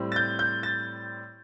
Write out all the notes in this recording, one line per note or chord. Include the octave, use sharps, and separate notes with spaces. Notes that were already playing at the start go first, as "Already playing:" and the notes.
Already playing: A2 G3 C4
A6
G6
G6
A6